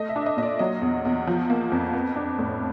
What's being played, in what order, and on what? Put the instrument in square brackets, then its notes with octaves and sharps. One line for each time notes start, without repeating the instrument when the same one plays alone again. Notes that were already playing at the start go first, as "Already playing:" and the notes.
Already playing: [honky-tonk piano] A3 D#5
E5
D4
E5
D#5
A#2 D#5
D5
F#3 D#5
E2
E2
F3
A#3
F2
B3
D4
A2